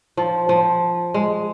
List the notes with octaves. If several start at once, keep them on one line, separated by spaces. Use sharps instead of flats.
F3
F3
G#3